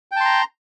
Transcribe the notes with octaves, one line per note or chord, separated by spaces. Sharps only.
G5 A5 A#5 C6